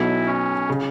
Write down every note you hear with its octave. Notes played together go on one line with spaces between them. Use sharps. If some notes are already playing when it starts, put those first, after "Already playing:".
Already playing: B1 B2 F#3 E4
C#4
C#3